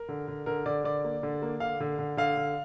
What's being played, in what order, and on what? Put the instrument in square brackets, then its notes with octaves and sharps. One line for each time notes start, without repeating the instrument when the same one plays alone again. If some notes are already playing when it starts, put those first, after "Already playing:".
Already playing: [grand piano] A#4
D3
D3
D3 A#4
D3 D5
D3 D5
A#3
D3
A#3
D3 F5
D3
D3
D3 F5
D3